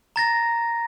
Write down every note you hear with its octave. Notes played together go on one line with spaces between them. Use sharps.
A#5 A6 A#6